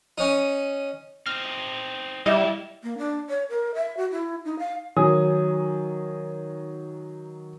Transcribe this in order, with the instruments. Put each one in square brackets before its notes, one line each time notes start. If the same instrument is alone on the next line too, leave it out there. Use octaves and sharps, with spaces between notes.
[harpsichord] C#4 D#4
[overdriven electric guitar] C4 D#4 [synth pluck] F6
[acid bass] G3 [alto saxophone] E4 [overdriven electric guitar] F4 E5 [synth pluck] D#5
[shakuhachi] A#3
D4
C#5
A#4
E5
F#4
E4
D#4
F5
[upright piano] D#3 F#3 G#5 D#6